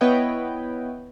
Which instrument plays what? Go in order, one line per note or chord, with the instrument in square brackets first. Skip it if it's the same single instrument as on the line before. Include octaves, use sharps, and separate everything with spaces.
[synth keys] B3 E4 B4 C#5 D#5 G5